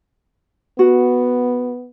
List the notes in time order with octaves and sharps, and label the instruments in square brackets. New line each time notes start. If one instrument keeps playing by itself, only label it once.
[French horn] B3 [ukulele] F#4